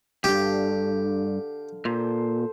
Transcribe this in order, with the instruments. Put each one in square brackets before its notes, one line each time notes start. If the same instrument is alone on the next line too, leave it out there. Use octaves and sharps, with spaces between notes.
[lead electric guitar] C2 G2 [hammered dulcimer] D3 F5 [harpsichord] G4
[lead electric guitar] A#2 [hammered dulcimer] A4 C5